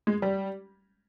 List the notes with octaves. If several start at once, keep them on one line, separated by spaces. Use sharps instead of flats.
G#3
G3